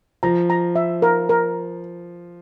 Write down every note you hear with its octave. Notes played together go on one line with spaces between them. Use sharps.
F3 A#5
A#5
E5
A#4
A#4